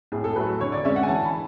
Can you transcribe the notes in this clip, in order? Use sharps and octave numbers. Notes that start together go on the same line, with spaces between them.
A2 G#4
A4
F#3 A3 B4
D3 C#5
D5
G#3 C#4 E5
F#5
G#5
E3 A5
B5